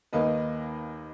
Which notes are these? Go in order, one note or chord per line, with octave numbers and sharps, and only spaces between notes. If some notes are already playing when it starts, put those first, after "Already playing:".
D#2 D#3 A#3 D#4 B4 D#5